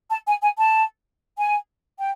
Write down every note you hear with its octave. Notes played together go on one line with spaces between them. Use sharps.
A5
G#5
G#5
A5
G#5
G5